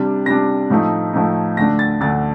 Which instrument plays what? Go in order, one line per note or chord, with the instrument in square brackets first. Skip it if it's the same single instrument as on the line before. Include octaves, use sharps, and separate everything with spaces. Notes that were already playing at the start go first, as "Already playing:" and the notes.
Already playing: [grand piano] C3 G3 D4
C3 G3 D4 A#6
A2 F3 A3 D#4
A2 F3 A3 D#4
D2 D3 A3 D4 A#6
A6
D2 D3 A3 D4 A6